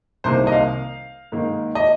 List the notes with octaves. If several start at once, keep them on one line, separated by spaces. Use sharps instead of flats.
C2 C3 D#3 A#3 C5
D#5
F5
G#2 D#3 A#3
D#5